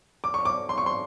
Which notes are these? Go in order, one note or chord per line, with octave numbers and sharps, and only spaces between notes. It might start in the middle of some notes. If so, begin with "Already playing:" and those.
D6
C#6
D6
C6
C#6
C6